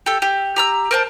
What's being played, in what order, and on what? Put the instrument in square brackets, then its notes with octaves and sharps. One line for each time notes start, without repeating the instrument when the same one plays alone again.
[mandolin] G4 A4
G4
G4 A#5 E6
A#4 C5 A5